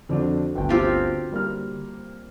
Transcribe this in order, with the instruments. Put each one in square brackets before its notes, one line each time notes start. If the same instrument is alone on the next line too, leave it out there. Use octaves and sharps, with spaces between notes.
[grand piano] F2 C4 D4 [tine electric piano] D3 F#4
[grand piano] G1 D2 G5
[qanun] C4 F4 G4
[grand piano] G3 A#3 F6